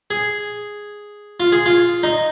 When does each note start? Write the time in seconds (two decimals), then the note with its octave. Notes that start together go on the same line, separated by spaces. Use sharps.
0.10 G#4
1.40 F4
1.52 G#4
1.66 F4
2.03 D#4